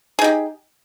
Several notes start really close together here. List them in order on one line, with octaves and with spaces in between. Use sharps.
G#4 D#4 G4